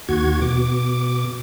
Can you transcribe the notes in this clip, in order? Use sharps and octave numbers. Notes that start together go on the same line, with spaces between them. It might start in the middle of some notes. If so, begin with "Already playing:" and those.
D#2 F#4 G#6
B2 D6